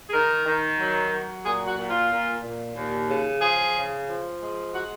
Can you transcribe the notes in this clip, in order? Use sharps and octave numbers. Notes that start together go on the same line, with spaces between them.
G#4
D#3 A#4
D#3
F#3
F#3
A#2 G#4
F#4
A#2
F4
A#2
A#2
D#2
C#3
F3 G#4
C#3
F3
G#3
F#4